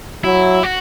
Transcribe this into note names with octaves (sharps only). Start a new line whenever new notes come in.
F#3 E4
F#4